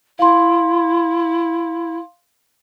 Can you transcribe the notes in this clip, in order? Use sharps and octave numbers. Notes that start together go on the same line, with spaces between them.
E4 F5 C6